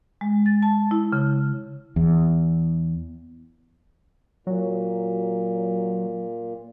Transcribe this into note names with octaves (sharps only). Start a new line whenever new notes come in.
G#3
A6
A5
E4
C#3
E2
A#2 F#3